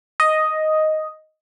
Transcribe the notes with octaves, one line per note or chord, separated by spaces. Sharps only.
D#5